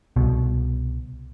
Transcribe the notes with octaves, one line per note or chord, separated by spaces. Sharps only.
C2 B2